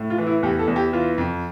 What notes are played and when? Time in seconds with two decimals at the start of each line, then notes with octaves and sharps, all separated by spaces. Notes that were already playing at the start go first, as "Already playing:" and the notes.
Already playing: A2
0.10 F4
0.18 E3
0.27 E4
0.43 E2 G4
0.59 A4
0.68 E2
0.76 G4
0.93 E3 F4
1.18 F2